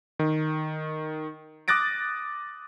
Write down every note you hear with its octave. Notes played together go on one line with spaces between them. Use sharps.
D#3
D6 D#6 F#6 A6 A#6 D7